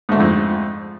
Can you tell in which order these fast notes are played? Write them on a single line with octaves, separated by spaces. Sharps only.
G#2 A3 D3 G#3 F2